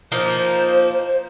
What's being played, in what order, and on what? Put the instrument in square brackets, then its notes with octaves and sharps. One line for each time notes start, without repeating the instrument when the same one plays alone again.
[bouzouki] F3 A#3 D#4 [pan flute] C5